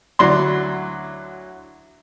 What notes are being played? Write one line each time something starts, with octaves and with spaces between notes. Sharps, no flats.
D2 F#3 E4 D5 C6